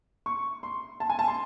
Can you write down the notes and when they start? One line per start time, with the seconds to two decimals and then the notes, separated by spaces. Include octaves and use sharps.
0.26 C#6
0.63 C6
1.00 A5
1.10 G#5
1.19 A5
1.28 C6